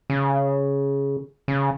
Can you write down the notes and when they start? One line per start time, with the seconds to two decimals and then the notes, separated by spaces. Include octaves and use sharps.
0.10 C#3
1.48 C#3